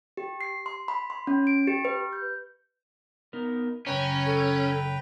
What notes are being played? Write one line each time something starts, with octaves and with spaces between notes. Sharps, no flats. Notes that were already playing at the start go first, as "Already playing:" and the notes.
G4
C7
C6
B5
C6
C#4
D7
G4
B4
G6
B3 D#4 A#4
F#2 C#3 C#4 B4 C#5 G5 A#5
A4